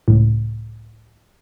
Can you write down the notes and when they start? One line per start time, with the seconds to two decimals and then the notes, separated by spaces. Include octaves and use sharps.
0.08 C#2 A2